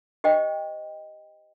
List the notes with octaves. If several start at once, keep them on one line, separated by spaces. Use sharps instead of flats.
G4 C5 D#5 G5